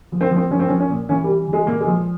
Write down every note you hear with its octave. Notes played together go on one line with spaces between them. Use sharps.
F3
C4
F3
C4
F3 C#4
C4
F3 C#4
C#4
A#2
E3 C#4
G3
C3
E3
G#3
A#2 A#3
G#3
F3